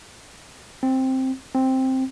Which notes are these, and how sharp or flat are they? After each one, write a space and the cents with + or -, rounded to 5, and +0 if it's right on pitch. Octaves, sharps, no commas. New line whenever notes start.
C4 +5
C4 +5